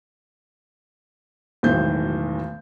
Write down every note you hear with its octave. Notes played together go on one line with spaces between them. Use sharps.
E1 B1 A2 D#3 C5 G6